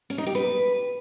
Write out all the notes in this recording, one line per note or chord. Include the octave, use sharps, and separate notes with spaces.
C#4
D#4
G4
B4